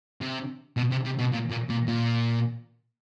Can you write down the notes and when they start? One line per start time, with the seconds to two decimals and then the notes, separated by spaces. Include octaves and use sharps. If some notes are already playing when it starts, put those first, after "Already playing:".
0.21 C3
0.77 B2
0.91 C3
1.05 C3
1.18 B2
1.32 A#2
1.50 A#2
1.70 A#2
1.88 A#2